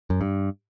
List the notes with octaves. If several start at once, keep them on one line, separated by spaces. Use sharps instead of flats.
F#2
G2